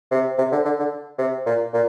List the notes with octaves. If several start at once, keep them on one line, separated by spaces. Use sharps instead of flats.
C3
C3
D3
D3
D3
C3
A#2
A#2